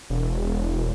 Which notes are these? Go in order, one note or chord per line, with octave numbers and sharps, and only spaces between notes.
E1